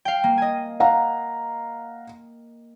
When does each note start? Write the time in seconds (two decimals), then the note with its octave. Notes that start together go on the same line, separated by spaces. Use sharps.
0.05 F5 G5
0.24 A#3
0.38 D#5 G#5
0.80 F5 F#5 A#5